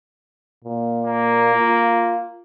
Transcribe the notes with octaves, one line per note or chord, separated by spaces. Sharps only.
A#2
A#3
F4